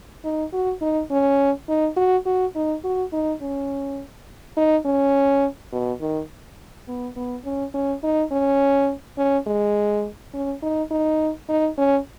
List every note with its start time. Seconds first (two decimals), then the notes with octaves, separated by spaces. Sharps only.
0.24 D#4
0.53 F#4
0.82 D#4
1.11 C#4
1.68 D#4
1.97 F#4
2.26 F#4
2.55 D#4
2.84 F#4
3.13 D#4
3.41 C#4
4.57 D#4
4.85 C#4
5.72 B2
6.01 D#3
6.88 B3
7.16 B3
7.45 C#4
7.74 C#4
8.03 D#4
8.32 C#4
9.18 C#4
9.47 G#3
10.34 C#4
10.63 D#4
10.91 D#4
11.49 D#4
11.78 C#4